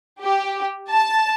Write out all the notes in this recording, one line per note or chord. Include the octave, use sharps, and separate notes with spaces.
G4
A5